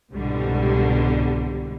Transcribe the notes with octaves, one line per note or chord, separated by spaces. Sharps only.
C2 G#2 B2 D3 G3